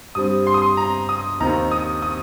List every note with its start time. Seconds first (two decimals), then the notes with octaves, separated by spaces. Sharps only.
0.15 G2 G3 C4 D#6
0.47 C6
0.54 D#6
0.62 C6
0.77 A#5
1.09 D#6
1.40 D#2 D#3 C4 A#5
1.71 D#6
2.02 D#6